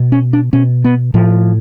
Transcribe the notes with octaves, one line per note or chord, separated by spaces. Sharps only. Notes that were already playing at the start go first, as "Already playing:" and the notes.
Already playing: B2
C#4
D4
B2 C#4
B3
A2 F3